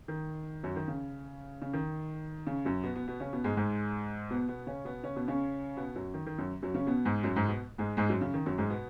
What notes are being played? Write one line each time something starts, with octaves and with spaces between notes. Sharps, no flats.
D#3
F#2 F#3
D#3
C#3
C#3
D#3
C#3
F#2 F#3
B2 B3
B2 B3
B2 B3
C#3 C#4
B2 B3
G#2 G#3
G#2 G#3
B2 B3
B2 B3
C#3 C#4
B2 B3
C#3 C#4
B2 B3
C#3 C#4
B2 B3
F#2 F#3
D#3
D#3
F#2 F#3
F#2 F#3
C#3 C#4
B2 B3
G#2 G#3
F#2 F#3
G#2 G#3
B2 B3
G#2 G#3
G#2 G#3
F#2 F#3
C#3
D#3
F#2 F#3
G#2 G#3
B2 B3